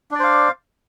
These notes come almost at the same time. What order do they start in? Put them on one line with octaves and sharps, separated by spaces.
D4 D5 C5 F5